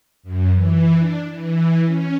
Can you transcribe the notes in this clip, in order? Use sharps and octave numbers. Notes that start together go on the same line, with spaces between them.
F#2
E3
D4
E3
C#4